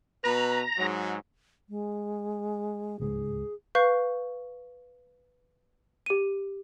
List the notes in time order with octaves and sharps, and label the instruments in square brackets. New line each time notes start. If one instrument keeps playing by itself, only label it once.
[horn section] B2 B4 [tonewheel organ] A#5
[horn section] G#2 F#3
[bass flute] G#3
[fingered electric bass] D1 C#2 G#2 [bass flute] G#4
[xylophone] B4 F5 C#6 G6 C7
G4 D#7